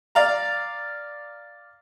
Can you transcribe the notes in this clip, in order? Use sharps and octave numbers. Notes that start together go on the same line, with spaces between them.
D5 F5 A#5